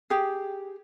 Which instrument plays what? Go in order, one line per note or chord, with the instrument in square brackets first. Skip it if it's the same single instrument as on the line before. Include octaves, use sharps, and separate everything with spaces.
[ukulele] G4 G#4